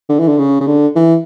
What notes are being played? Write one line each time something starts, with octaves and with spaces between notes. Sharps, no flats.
D3
E3
D3
C#3
C#3
D3
E3